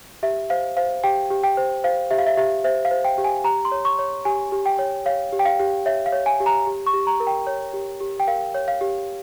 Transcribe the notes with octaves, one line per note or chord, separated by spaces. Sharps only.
G4 E5
C5 F5
C5 F5
G4 G5
G4
G5
C5
C5 F5
G4 E5
F5
E5
G4 E5
C5 E5
F5
C5
G5
G4
G#5
G4 A#5
C6
C#5
C#6
C#5
G4 G#5
G4
G5
C#5
C#5 F5
G4
G5
F5
G4
C#5 E5
F5
C#5
G#5
G4
A#5
G4
C#6
G4
A#5
A#4
G5
C#5
G4
G4
G5
A#4 F5
C#5
F5
G4